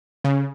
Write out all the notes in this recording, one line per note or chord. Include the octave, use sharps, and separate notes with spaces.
C#3